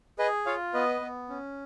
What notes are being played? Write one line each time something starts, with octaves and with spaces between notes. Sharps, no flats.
G#4 B4 D#5
F4 C#5 F5
B3 B4 D#5
B3
C#4